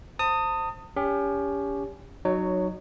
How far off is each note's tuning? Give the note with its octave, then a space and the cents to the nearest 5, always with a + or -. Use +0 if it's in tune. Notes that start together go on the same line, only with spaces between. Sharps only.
C5 +0 A5 +40 D#6 +0
C#4 +35 G4 +30
F#3 +0 D#4 -25 C#5 +10